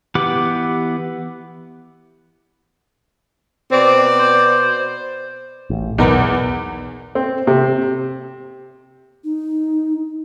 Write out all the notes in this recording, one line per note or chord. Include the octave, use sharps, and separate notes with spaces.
E3 B3 G4 F#5 D6
B2 C4 D5
C5
A1
B1 E2 D#4 A#4 B4
C4
C3
D#4